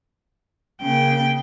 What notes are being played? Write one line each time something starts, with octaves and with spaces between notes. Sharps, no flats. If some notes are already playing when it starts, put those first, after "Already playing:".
C#3 A#3 G5